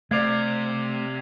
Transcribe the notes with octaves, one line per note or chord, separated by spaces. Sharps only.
C3 A3 D5 F5 G#6 C7 F7